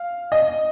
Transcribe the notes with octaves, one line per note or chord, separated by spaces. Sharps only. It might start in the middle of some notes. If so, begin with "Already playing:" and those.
Already playing: F5
D#5